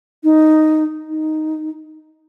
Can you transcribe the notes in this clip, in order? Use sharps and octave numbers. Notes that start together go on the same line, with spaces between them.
D#4
D#4